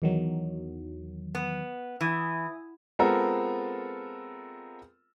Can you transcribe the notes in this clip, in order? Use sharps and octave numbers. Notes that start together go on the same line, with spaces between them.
E2 D#3 F#3
B3
E3 E5 G#5 D#6
G#3 B3 C4 F4 A4 A#4